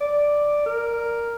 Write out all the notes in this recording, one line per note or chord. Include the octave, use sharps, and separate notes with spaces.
D5
A#4